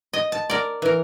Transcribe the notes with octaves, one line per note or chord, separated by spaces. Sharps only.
D#5
A5
A#4 D5
E3 A#4